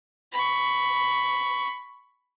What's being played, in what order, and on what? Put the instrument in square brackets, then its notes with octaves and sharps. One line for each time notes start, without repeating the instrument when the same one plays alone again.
[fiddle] B5 C#6